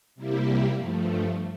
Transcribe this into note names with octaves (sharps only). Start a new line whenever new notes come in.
C3 G3 A#3 E4 G4
G2 F3 A3